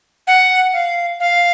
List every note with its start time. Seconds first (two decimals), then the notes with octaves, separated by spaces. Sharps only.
0.27 F#5
0.73 F5
1.20 F5